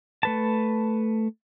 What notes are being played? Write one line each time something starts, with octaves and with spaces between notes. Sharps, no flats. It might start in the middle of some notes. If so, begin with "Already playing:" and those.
A3 B4 A5